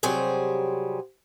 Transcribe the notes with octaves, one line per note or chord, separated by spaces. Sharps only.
C3 F#3 G3 G#4 C5